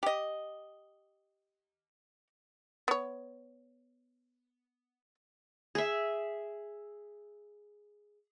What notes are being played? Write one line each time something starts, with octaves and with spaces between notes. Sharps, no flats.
G4 D#5
B3 C#5
G#4 E5